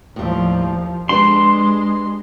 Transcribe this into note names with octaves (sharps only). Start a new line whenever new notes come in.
D#2 A2 F3 G3
G#3 D4 G4 B4 C6